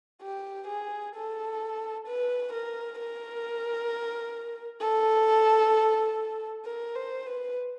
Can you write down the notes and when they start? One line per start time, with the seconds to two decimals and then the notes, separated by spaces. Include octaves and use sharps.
0.22 G4
0.68 G#4
1.15 A4
2.07 B4
2.53 A#4
2.99 A#4
4.81 A4
6.65 A#4
6.96 C5
7.26 B4